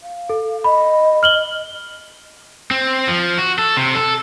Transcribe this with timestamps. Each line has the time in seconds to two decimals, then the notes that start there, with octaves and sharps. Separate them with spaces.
0.02 F5
0.30 A4
0.64 D#5 B5
1.23 F6 F#7 G7
2.71 C4
3.08 F3
3.39 F#4
3.59 A4
3.77 C3
3.95 A4